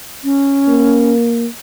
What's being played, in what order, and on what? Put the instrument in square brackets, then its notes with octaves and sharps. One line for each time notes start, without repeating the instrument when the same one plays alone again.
[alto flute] C#4
[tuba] A#3